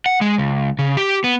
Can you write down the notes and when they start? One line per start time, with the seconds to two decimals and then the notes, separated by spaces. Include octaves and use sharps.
0.06 F#5
0.21 G#3
0.38 C#2
0.79 C#3
0.97 G4
1.24 B3